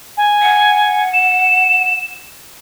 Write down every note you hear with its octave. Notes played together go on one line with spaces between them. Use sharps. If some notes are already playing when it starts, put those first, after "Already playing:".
G#5
F#5
E7